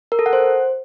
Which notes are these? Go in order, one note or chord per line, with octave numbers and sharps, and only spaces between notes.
A#4
A4
F#5
C5